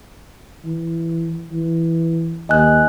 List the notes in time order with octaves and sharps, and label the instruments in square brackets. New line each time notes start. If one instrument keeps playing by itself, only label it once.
[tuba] E3
E3
[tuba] D#2 [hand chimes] D#5 G#5 F#6